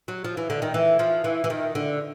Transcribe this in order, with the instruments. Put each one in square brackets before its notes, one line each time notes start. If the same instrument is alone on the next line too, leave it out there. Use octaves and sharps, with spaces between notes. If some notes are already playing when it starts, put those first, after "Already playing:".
[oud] F#3
F3
E3
D3
D#3
E3
F3
E3
E3
D#3
D3